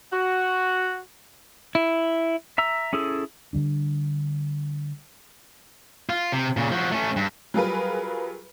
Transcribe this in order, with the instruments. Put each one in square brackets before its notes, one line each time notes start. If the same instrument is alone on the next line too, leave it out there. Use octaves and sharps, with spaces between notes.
[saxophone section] F#4
[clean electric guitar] E4
[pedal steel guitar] E5 A#5 E6
C#4 E4 G#4 A4
[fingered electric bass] D3 D#3 G3 D4
[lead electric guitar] F4
C3
A#2 C#3
F3 F#4
A3 C#4
G2
[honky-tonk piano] F#3 G3 F4 G#4 A#4 B4